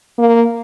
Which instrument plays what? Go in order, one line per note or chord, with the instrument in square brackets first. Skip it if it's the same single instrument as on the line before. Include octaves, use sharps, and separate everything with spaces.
[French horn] A#3